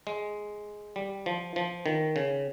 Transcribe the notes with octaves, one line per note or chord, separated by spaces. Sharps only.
G#3
G3
F3
F3
D#3
C#3